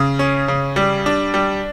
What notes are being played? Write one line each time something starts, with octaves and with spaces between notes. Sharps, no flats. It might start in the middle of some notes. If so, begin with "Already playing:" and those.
Already playing: C#3
C#4
C#3
G3
D4
G3